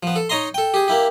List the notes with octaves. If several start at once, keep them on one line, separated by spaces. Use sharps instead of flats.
F3 B3
A4
D#4 C#5 D#5 A#5 C6
A4 G5
G4 G#4
A#3 E4 G4